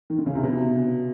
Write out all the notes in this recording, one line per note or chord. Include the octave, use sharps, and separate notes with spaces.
D#3
D3
C#3
C3
B2